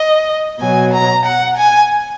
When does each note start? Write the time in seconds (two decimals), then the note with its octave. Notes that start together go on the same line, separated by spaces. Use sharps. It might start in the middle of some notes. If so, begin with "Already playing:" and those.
Already playing: D#5
0.60 B2 F#3 G#5
0.93 A#5
1.25 F#5
1.57 G#5